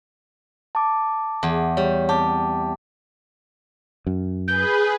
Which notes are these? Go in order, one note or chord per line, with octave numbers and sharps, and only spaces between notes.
A5 D6
E2
G3 C#5
C4 G4 A5 D6
F#2
G#4 B4 G6